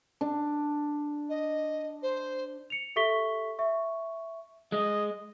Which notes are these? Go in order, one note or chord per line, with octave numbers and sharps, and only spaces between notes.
D4
D#5
C5
C#7 F7
G4 A4 E5 C#6 B6 G7
E5 C#6
G#3 D#5